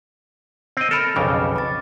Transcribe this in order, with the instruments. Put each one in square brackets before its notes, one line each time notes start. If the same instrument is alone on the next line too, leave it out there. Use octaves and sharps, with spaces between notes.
[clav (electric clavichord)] C4 D#5
[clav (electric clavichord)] A4 A#4 [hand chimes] B5 F6
[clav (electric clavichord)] B1 F2 C#3 [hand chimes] D6
[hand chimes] D6 A6